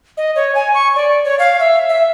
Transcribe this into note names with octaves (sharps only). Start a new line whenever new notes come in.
D#5
C#5
G#5
C#6
D5
C#5
F5
E5
E5